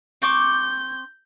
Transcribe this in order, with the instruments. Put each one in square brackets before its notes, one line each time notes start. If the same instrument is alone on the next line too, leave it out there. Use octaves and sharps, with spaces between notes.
[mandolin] C4 C#6 D6 [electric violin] G6